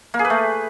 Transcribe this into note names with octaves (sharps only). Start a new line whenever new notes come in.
A#3
G#4
B4
A3